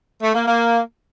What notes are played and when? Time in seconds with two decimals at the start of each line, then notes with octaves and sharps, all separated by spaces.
0.22 A3
0.34 A#3
0.46 A#3